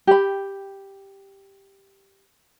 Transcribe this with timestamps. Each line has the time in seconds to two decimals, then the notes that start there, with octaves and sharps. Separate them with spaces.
0.07 G4 B5